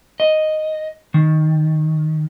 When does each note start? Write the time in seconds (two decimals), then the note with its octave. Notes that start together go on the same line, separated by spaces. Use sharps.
0.20 D#5
1.14 D#3